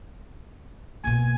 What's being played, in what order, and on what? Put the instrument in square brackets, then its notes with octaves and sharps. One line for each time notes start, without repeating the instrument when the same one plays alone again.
[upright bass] B2 A#3 [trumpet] G#5